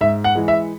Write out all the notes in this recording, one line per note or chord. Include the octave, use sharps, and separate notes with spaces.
G#2 E5
F#5
E3 G#3
E5